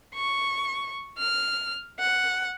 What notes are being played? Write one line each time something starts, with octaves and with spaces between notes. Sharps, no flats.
C#6
F6
F#5